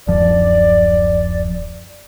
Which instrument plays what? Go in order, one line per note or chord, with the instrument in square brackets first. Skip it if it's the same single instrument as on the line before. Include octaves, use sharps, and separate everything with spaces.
[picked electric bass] D1 F#2 F3 [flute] D5